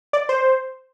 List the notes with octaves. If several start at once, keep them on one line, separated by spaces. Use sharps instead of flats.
D5
C5